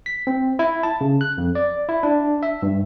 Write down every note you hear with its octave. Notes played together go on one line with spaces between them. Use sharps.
B6
C4
E4
A5
C#3
F#6
F2
D5
E4
D4
E5
G2